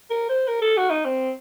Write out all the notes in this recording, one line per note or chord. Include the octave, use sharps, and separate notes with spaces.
A#4
C5
A#4
A4
F#4
D#4
C4